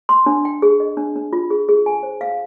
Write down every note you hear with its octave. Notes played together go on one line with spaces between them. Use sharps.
C6
D4
G5
G#4
D#5
D4
D4
F4
G#4
G#4
G#5
C5
F5